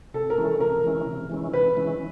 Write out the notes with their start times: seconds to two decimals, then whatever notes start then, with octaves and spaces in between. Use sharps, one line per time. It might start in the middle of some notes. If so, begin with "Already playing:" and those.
0.14 C3 A4
0.30 A#4
0.37 E3 G#3 C#4 E4
0.45 A4
0.60 C3 A#4
0.84 E3 G#3 C#4 E4
1.06 C3
1.30 E3 G#3 C#4 E4
1.53 C3 B4
1.77 E3 G#3 C#4 E4